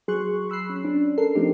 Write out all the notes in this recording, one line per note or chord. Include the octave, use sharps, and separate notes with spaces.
F#3 G#4 C6 C#6 F#6
B5 E6 F#6 C7
C#4
C#4 D4
A4 A#4 C7
F3 A3 C4 D#4 G4